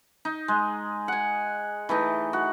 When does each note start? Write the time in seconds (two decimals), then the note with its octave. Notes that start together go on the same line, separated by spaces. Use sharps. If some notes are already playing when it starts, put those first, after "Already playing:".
0.25 D#4
0.48 G#3
1.08 F#5 G#5
1.89 E3 A3 D#4
2.33 F#4